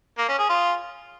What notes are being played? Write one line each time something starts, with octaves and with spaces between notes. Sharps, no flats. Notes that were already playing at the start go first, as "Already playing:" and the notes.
A#3
C#4
G#4
F4